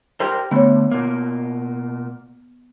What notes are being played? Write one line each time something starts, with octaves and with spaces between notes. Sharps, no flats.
G4 A#4 C5
D3 A3 B3 C#5
B2 A#3